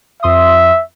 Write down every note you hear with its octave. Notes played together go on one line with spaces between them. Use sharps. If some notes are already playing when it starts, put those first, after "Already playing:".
F2 E5 C6 D#6